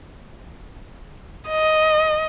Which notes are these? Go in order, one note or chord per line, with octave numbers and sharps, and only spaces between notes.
D#5